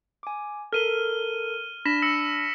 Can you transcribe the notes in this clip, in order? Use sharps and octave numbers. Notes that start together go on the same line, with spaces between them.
G#5 D6
A4 A#4 F6 D#7 G7
D4 B5 A#6 B6 E7
E6 A#6 C#7